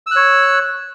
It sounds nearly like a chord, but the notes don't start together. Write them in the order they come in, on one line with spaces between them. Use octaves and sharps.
E6 F#6 C#5